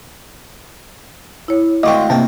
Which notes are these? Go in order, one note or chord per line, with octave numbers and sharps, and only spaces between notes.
E4 C#5
D2 G#3 C4 D#5 F5 G5 C#6 D6
C3 A#3 G5 A5